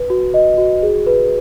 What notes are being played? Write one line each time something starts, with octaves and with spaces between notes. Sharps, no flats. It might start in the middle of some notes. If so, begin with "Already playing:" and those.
Already playing: B4
F#4
D#5
F#4
G#4
B4